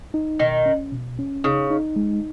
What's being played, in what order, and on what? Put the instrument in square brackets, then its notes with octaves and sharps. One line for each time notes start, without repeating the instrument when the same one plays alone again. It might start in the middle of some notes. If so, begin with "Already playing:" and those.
[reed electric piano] D#4
[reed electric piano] B2 [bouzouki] D#3
[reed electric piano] C#4
B2
C#4
[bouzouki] C#3 [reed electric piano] D#4
[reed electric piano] D#4
G#3